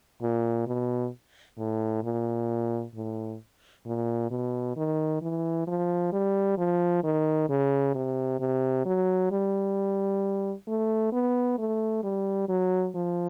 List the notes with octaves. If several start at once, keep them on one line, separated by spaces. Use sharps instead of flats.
A#2
B2
A2
A#2
A2
A#2
B2
D#3
E3
F3
G3
F3
D#3
C#3
C3
C3
F#3
G3
A3
B3
A3
G3
F#3
F3